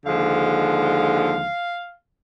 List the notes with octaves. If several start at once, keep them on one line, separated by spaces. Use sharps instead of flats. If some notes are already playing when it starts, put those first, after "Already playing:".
D#2 D3 F3 G#3 F5